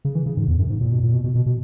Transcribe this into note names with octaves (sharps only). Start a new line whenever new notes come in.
C#3
E3
C#3
G#2
E2
F#2
G#2
A#2
B2
A#2
B2
B2
B2
B2